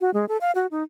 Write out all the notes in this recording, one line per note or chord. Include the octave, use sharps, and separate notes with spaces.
F#4
G#3
A4
F5
F#4
D#4